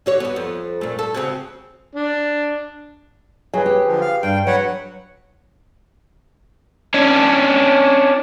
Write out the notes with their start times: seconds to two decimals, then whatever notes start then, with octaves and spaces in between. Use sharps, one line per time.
0.06 D3 F#4 C#5
0.20 B3 F#4
0.36 F2
0.81 A#2 A3
0.99 A4
1.14 C#3 C4 F#4
1.95 D4
3.54 F#3 G#4 B4 G#5
3.66 G4
3.86 D3 F3
4.01 F5
4.23 G2 G5
4.47 F#3 B4 C#5 F#5
6.94 C#4 D4